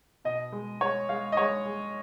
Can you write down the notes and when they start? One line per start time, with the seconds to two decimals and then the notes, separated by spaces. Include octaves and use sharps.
0.25 B2 D#5
0.52 G#3
0.81 G#3 C#5
1.09 G#3 F5
1.32 D#5
1.37 G#3 C#5
1.65 G#3